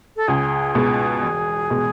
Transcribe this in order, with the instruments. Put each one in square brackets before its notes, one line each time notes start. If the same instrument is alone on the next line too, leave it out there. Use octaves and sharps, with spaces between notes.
[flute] A4
[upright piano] C#2 [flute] G#4
[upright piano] B2 G#3
E1
B2 G#3